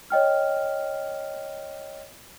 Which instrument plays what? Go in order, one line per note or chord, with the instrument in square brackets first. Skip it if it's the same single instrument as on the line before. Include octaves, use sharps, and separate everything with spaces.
[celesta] C#5 D#5 G5 F6